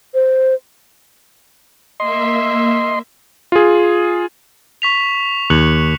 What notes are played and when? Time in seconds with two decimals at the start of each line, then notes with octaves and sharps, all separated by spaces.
0.14 C5
2.00 A#3 D#5 E5 C6
3.52 F4 G#4
4.82 C#6 B6 F7
5.50 D#2 F#6 C#7 F#7